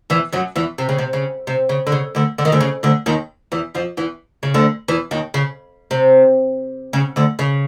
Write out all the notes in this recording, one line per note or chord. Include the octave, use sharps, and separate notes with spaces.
E2 E3
F#2 F#3
E2 E3
C3
C#3
C3
C#3
C3
C#3
D3
C#3
D2 D3
D3
D#3
D2 D3
C#3
D2 D3
D#2 D#3
E2 E3
F2 F3
E2 E3
C#3
D2 D3
E2 E3
D#2 D#3
C#3
C3
C#3
D2 D3
C#3